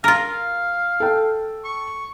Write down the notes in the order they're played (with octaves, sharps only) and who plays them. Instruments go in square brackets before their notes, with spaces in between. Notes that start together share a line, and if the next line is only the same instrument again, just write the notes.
[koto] F4 A#4 [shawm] F5
[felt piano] A4 G5
[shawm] C#6